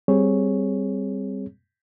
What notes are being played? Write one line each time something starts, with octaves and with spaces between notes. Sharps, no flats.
G3 C4 G#4 C#5